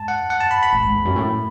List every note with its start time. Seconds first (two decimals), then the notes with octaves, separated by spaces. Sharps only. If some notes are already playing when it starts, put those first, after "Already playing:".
Already playing: G#2 A5
0.08 F#5
0.30 F#5
0.40 A5
0.51 B5
0.63 B5
0.73 A2
0.84 G#2
0.95 E2
1.05 F#2
1.16 A2